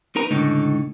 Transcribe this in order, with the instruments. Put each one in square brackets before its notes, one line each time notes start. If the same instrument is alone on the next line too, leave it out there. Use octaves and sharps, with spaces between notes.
[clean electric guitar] D#4 A#4 B4 A#5
C#2 A2 D3 D#4